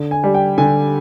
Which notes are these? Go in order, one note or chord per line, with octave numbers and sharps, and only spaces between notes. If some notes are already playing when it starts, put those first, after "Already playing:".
Already playing: D3
G#5
G3
G5
D3 G#5